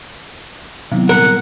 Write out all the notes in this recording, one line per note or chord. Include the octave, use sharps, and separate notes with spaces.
C3 D#3 F#3 B3 E4
A#2 G3 A#4 F#5